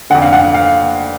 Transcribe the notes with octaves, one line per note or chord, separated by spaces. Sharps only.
F2 D3 F#5
F5
F#5
F5